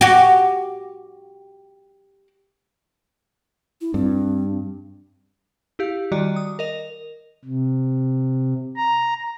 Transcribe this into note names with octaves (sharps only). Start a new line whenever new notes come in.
F#4 G4
E4
G2 C4
E4 G4 F5
D#3 G3 F#4 D5 D#5
D#6
A#4 D#5 F7
C3
A#5